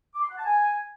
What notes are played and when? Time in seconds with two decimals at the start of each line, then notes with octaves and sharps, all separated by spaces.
0.15 D6
0.22 C6
0.30 F#5
0.37 A5
0.45 G#5